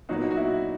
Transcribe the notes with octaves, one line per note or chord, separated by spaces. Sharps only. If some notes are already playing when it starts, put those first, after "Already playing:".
A#2 F#3 B3 D#4 F#4
D#4
F#4
E4